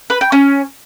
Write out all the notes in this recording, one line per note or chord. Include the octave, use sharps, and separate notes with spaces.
B4
G5
C#4